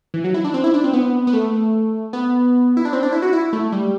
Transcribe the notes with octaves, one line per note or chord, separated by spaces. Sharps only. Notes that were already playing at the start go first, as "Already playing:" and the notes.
E3
F#3
E4
D4
C4
E4
D4
C4
B3
B3
A3
B3
E4
D4
C4
D4
E4
F#4
E4
A3
G3